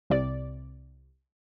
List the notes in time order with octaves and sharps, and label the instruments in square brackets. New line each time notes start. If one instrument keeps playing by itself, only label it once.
[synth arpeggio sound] C2 C3 D5